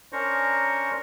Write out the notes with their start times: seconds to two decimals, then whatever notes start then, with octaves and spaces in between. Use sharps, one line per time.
0.13 C#4 D4 A#4 C5 A#5 C#6